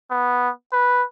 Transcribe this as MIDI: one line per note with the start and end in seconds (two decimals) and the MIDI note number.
0.11 0.50 59
0.73 1.04 71